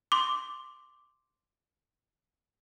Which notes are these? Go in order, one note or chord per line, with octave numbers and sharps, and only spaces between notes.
C6 D6